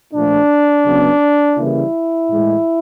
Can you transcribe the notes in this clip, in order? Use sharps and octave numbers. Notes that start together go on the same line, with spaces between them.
A#2 F3 A3 D4
C#3 F#3 B3
C#3 E3 G3 A#3 E4
A2 E3 G#3